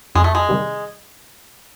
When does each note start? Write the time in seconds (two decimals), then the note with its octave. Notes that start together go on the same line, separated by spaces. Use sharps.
0.15 F2 G#3
0.24 A3
0.35 G#3
0.49 C3 D#3 G3